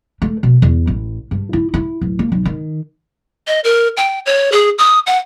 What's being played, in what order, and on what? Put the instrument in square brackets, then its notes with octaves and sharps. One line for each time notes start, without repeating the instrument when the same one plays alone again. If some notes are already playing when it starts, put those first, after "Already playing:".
[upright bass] A3
B2
E2
A1
G2
E4
E4
D1
A#3
B1
D#3
[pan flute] D#5
A#4
G5
C#5
G#4
D#6
F#5